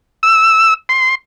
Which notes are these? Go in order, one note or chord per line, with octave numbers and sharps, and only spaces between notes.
E6
C6